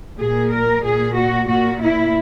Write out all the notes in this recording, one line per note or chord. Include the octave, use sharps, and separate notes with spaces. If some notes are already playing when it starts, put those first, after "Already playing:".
A#2 G#4
A#4
A#2 G#4
F#4
A#2 F#4
E4